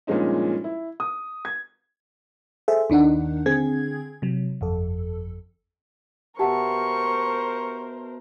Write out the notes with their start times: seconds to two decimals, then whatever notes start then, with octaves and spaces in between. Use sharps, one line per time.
0.07 G2 A#2 F3 G#3 C#4 D#4
0.64 E4
1.00 D#6
1.45 G#6
2.68 G#4 A4 C5 E5
2.90 D#2 D#3 D4 D#4 F#5
3.46 D3 C4 G#4 G#6
4.22 C3 F#3
4.61 G1 F2 A4
6.39 B2 G4 A#4 C5 E5 F#5 A5 C#6